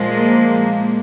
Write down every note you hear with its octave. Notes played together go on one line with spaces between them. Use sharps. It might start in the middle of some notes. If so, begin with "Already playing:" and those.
Already playing: A#2 F3 G#3
A#3